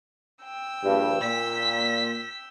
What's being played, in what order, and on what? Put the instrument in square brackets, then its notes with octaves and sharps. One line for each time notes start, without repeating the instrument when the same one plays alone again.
[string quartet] G5 E6
[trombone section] A#1 G2
[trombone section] A#2 [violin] B6